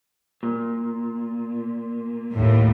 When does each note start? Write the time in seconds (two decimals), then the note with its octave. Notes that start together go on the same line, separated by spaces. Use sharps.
0.43 A#2
2.34 D#2 A2